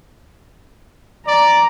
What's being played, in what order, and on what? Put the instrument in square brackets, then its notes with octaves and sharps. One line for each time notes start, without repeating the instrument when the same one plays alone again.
[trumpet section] D5 [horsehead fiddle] A#5